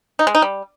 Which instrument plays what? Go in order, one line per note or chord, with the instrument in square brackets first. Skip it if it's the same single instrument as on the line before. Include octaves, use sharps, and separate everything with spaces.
[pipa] D#4
G#3
D#4
G3